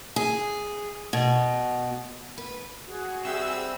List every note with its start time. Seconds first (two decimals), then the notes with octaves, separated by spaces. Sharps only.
0.16 G#4
1.13 B2
2.38 B4
2.87 F#4 G#4
3.25 G3 C4 E5 E6